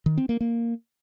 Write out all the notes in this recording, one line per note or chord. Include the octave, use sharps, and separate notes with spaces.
D#3
C4
A#3
A#3